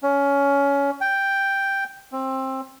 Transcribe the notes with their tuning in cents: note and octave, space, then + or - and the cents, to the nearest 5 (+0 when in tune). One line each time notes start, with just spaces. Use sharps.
C#4 +20
G5 +0
C4 +20